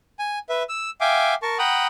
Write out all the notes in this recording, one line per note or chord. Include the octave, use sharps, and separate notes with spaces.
G#5
B4 E5
E6
E5 F5 G5 G#5 D6
A#4 A5 C#6
F#5 G5 A#5 B5 D#6